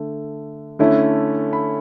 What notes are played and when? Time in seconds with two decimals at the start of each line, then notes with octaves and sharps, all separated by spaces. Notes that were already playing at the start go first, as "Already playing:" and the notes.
Already playing: D3 A3
0.79 D3 A3 C#4 E4
1.53 B5